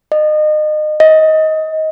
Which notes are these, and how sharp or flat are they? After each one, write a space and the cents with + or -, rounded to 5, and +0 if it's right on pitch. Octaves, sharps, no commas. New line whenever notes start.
D#5 -30
D#5 +15